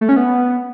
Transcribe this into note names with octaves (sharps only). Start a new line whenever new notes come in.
A3
C#4
B3